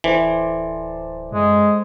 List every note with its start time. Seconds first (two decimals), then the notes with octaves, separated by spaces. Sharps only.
0.04 D1 E3 A4 C5 D5
1.32 F#2 G#3